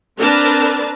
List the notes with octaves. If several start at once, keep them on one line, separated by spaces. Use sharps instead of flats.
C4 D4 A#4 B4 A5